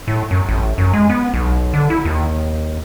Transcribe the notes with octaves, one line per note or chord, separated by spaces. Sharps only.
A2
F#2
A1
F#2
G#3
B3
B1
D3
E4
D#2